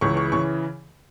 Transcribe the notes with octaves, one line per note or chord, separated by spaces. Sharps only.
C#2 C#3 E3 C#6
C#6
C#3 E3 C#6